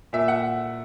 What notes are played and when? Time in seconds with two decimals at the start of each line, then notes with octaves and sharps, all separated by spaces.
0.13 A#2 E5
0.28 F#5